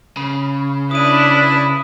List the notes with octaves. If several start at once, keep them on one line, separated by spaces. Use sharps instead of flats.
C#3 B5
D4 E4 B4 D#6 D#7